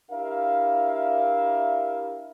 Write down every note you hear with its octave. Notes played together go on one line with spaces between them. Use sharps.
D4 E4 G4 A#4 E5 F5